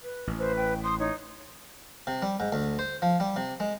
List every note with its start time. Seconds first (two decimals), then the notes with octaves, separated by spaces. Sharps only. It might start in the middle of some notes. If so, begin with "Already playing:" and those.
0.03 B4
0.27 A1
0.39 B4 C5
0.56 G5
0.84 C6 D#6
0.99 D#4 C#5
2.07 C3
2.22 G3
2.40 G#2
2.52 D2
2.79 C5
3.02 F3
3.20 G3
3.36 C3
3.60 G#3